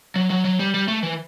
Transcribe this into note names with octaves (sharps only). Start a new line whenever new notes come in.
F#3
F#3
F#3
G3
G3
A3
E3